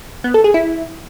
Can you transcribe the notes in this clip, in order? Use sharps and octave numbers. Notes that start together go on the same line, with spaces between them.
B3
A4
G#4
E4